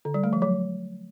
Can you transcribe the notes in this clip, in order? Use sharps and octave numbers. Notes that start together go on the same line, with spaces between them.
D3
G3
A3
F3
F#3